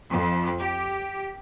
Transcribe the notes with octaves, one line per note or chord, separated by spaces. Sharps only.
F2
G4